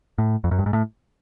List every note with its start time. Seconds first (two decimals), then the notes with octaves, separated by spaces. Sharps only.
0.18 A2
0.44 F2
0.51 F#2
0.59 G2
0.66 G#2
0.73 A2